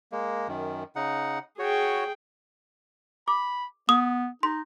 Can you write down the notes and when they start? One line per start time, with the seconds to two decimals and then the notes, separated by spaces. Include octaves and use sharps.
0.12 G#3 A#3
0.48 F#2 D#3
0.96 C#3 D#4 F#5
1.59 F#4 G#4 C#5 G5
3.28 B5 D6
3.89 B3 D#6
4.43 D#4 C6